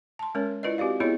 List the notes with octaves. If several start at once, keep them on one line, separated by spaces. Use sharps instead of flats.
A5 C6
G#3 C#4 A#4 C#5
E4 F4 B4 D5 D#5
C4 F#4 G4 D5 F5
B3 E4 F4 G#4 C#5 D#5